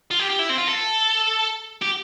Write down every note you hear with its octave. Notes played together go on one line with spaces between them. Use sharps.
F4
G4
G4
E4
C4
F4
A4
G4